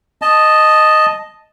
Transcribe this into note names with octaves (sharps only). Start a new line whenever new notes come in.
D#5 A5